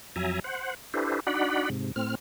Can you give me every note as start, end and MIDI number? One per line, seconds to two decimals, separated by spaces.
0.16 0.40 41
0.16 0.40 54
0.16 0.40 76
0.16 0.40 80
0.16 0.40 82
0.44 0.75 72
0.44 0.75 78
0.94 1.20 62
0.94 1.20 64
0.94 1.20 67
0.94 1.20 69
0.94 1.20 71
0.94 1.20 72
1.27 1.70 62
1.27 1.70 63
1.27 1.70 66
1.27 1.70 74
1.27 1.70 78
1.27 1.70 83
1.70 1.92 44
1.70 1.92 48
1.96 2.15 45
1.96 2.15 60
1.96 2.15 89